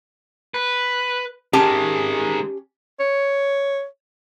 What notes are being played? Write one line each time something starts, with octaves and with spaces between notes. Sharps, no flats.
B4
D#3 G#3 C#4 G4 A5
C#5